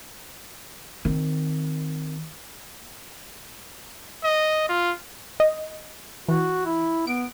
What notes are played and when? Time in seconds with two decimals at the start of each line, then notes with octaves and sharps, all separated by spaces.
1.05 D#3 C4
4.23 D#5
4.69 F4
5.40 D#5
6.28 E3 F#4
6.65 E4
7.07 B3 D7